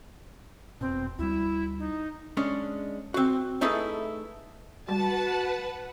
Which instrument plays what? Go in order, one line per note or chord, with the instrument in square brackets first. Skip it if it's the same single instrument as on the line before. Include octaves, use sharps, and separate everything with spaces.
[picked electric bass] F1 B2 [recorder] C4
[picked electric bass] D2 G3 [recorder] E4
[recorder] D#4
[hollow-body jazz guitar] G#3 C#4 D4
C4 F#4
A3 D#4 E4 G#4 A4 B4
[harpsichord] G3 [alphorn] F#4 [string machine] B4 F#5 [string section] A5